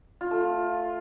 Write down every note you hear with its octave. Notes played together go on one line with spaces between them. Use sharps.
F4
A3
F4